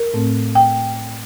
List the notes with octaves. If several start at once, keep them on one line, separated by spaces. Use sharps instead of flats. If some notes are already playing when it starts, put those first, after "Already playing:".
Already playing: A#4
A2 A3 C4
G5